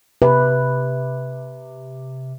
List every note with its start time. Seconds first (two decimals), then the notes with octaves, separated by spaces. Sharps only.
0.22 C3 B4